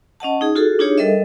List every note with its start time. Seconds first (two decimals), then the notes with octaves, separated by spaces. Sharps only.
0.20 C#4 D#5 F#5 A5
0.41 D#4 G#4
0.55 F4 F#4 G#4 A4
0.79 D4 D#4 F4 G4 G#4 C#5
0.98 G3 A4 A#4 D#5 E5